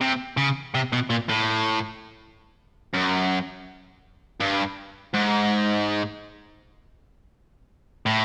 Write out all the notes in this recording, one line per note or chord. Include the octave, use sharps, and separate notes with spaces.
C3
C#3
C3
B2
A#2
A2
F#2
G2
G#2
A2